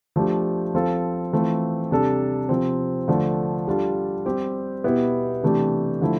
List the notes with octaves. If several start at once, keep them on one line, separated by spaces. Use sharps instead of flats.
F3 A3 D4 G4
F3 C4 F4 A4
E3 A3 C4 F4
C3 G3 D4 A4
C3 F3 C4
D3 F3 A3 D4
G3 D4 F4 A4
G3 C4 G4
B2 B3 E4 G4
C3 E3 A3 D4 G4
D3 F3 A3 E4